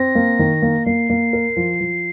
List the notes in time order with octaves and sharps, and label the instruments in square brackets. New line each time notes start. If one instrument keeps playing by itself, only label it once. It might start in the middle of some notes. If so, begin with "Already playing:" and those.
Already playing: [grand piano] C4 [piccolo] A#6
[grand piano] A#3
D#3
A#3
[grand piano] A#3 [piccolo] C7
[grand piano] A#3
A#4
F3
F3